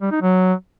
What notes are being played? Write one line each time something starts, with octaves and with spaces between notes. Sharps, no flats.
G3
D#4
F#3